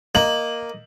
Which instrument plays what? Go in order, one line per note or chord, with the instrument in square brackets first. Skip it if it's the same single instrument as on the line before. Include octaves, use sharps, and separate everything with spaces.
[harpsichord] A#3 [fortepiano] D#5 [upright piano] F#7